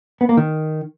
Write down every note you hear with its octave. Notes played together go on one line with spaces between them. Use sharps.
B3
A#3
D#3